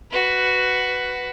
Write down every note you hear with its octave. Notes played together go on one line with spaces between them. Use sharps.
F#4 B4